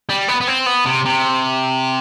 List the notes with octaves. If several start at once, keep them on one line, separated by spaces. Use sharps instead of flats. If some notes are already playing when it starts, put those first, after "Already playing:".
G3
B3
B3
C4
B3
C3
C3